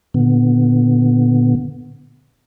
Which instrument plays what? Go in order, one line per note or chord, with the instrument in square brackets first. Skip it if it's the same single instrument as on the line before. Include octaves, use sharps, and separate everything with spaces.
[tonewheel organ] A#2 D3 B3